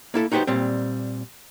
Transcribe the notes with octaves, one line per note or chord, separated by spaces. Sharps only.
A#3 E4 A4
D#4 F#4 G4 B4 C5
A#2 G3 C4